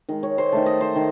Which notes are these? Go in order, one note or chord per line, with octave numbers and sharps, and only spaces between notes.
D#3 G#3 D#5
C#5
C5
D#3 A3 A4
D#5
C5
D#3